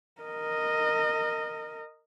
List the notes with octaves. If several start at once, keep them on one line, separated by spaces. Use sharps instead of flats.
A#4 D#5